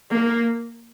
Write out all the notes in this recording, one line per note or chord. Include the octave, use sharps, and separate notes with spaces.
A#3